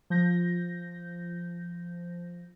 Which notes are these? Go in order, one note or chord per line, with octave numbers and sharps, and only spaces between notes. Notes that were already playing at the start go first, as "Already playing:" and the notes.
F3 G6 A#6